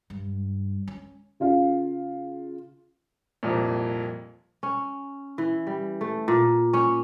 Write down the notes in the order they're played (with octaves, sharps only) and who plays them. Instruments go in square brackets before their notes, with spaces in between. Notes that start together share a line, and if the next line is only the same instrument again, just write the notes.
[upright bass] G2
C#4
[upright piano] C#3 F4 F5
C2 F2 A#2
[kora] C#4
E3
G3
A3
A#2
C#4